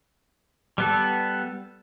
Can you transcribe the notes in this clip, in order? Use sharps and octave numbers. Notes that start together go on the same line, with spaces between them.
G3 B3 A4